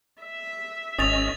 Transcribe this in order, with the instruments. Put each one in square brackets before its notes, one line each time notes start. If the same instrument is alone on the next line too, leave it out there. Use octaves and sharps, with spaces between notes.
[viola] E5
[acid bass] G#1 [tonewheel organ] C#4 D#5 [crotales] D#6 A6 F7